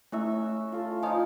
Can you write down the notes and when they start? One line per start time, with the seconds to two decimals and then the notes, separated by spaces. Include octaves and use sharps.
0.12 A3 C#4 E4 E5
0.72 F4 A4
1.03 F3 D#4 D#5 G#5